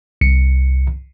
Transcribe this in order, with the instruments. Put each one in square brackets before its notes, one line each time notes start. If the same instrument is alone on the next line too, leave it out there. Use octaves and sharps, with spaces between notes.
[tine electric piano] C2 C#7